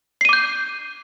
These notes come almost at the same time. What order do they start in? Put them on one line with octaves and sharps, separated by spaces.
C7 D#7 D6 G6